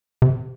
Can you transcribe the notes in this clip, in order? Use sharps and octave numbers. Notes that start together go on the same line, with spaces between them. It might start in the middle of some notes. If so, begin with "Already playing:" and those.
C3